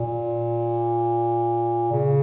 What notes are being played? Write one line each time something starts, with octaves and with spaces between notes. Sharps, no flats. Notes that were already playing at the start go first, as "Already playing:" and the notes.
Already playing: A#2
C#3